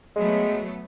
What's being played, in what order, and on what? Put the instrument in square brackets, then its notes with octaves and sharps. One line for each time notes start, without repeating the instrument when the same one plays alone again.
[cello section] F#3 A3 B3 [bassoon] G#3